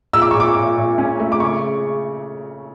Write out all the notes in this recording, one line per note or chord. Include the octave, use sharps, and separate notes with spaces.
A#2 E6
D6
A#2 C#6
D6
A#2
A#2
C#4
A3
D6
C#3 C#6